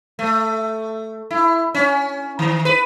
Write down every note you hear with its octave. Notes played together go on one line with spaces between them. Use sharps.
A3
E4
C#4
D#3
B4